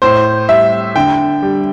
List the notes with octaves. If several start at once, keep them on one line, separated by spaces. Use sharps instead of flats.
A2 C5
G3 E5
D3 G5
G3